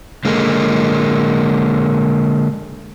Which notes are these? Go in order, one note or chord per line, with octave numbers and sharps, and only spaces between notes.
D3 G#3 A#3